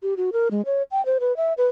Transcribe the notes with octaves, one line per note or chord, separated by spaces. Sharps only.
G4
F#4
A#4
G#3
C#5
G5
C5
B4
E5
B4